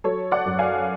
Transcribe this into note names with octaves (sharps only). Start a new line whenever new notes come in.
F#3 A4 C#5
D5 F#5
F#2
F5 G#5